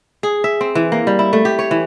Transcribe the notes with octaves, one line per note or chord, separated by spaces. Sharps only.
G#4
E5
C4
E3
A#3
G3
E4
A3
G4
C#5
E3